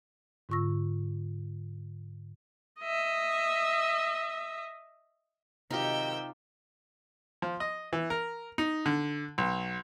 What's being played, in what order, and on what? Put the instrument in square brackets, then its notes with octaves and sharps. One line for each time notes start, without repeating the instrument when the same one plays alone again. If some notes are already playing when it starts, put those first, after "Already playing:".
[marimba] G#2 D3 F4 C#6 E6 A#6
[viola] D#5 E5
[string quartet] C3 G5 E6 [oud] D#3 F#3 [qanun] D#4 F4 G4
[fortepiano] F3
D#5
E3
A#4
D#4
D3
B1